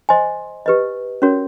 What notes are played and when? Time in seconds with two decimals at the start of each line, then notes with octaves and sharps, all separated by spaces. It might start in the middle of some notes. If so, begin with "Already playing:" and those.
0.09 C5 D#5 G#5 C6
0.66 G4 B4 D#5
1.22 C#4 F#4 A#4 C#5